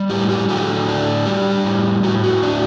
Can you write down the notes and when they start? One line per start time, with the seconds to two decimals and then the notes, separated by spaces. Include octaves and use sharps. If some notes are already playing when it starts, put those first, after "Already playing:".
Already playing: G3
0.09 A2 G4
0.30 G4
0.49 A2 F#4 A4
0.88 D4
1.26 G3 G4
1.64 A2
2.03 A2 F#4
2.23 F#4
2.43 D4